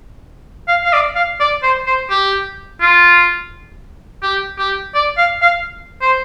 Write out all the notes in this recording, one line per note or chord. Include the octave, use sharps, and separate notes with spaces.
F5
F5
D5
F5
D5
C5
C5
G4
F4
G4
G4
D5
F5
F5
C5